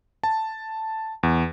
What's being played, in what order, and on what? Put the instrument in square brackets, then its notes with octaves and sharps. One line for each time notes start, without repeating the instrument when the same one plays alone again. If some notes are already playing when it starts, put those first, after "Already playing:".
[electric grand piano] A5
E2